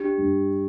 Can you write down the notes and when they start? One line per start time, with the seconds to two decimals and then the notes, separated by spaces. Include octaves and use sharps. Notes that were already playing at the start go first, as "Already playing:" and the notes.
Already playing: D4 G4
0.18 G2